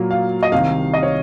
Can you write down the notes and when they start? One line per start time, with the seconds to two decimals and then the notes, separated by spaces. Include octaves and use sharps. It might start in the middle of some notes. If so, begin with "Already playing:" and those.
Already playing: A#2 F#3 A#3
0.11 F5
0.43 D#5
0.52 C2 C3 D#3 F5
0.94 D#5
1.03 C#5